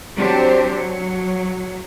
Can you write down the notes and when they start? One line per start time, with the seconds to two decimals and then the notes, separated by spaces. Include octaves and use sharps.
0.17 F#3 C4 D4 G4 C5
0.73 F#3